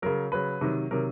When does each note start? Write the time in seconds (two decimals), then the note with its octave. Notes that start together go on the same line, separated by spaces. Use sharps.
0.02 C#3 F#3 A#4
0.32 C#3 F#3 B4
0.61 C3 D#3 F#3
0.91 C3 D#3 F#3 A#4